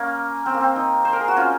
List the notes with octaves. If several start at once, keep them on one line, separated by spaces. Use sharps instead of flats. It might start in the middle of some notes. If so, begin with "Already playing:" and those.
Already playing: A#3 C#4
C4
A#3
C4
D#4
C5
A#4
G#4
F#4
C#4 F4